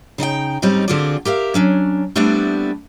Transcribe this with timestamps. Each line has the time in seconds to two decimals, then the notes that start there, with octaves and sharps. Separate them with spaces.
0.18 C#3 D#4 D#5 G5
0.62 G#2 G3 C4 C#4 D#4
0.88 D3 C4 F4 F#4 G#4 D5
1.25 G4 A#4 E5 F5
1.54 F#3 C#4 D4
2.16 G3 A3 B3 C4 D4 E4